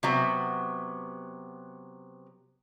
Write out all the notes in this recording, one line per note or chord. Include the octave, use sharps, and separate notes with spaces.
C3 F#3 B3